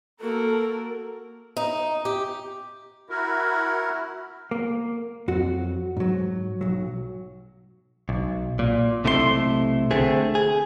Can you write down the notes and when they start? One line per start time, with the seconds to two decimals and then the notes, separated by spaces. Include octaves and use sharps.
0.20 A#3 F#4 A4 A#4
1.57 D#4
2.05 G4
3.10 E4 F#4 A#4
4.51 A#3
5.28 F2 F#3 F#4
5.97 G#2 F#3
6.61 B1 F#3
8.09 B1
8.59 A#2
9.04 B1 C3 A3 E4 A4 C6
9.91 D3 A3 C4 G#4
10.35 G#4